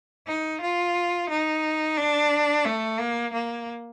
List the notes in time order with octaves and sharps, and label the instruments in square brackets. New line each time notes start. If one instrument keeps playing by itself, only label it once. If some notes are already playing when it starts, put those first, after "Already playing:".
[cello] D#4
F4
D#4
D4
A3
A#3
A#3